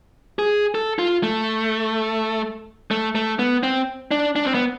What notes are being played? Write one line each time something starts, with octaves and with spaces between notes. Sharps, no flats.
G#4
A4
F4
A3
A3
A3
B3
C4
D4
D4
C4
B3